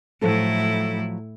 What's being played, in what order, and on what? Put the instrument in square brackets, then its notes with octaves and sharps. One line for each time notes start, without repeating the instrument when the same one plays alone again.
[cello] A2 E4 [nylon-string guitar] F3 F#3 A4